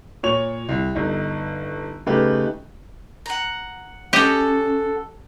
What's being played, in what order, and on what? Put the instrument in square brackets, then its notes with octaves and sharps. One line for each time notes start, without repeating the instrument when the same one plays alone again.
[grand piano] A#2 C#5 F7
C2
G1 D#4
C#3 A3 D#4 G4 B4
[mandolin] F#5 A#5
[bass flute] C#4 [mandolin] F#4 A4 [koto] G4 D#5